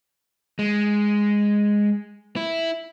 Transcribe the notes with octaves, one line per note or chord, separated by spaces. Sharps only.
G#3
E4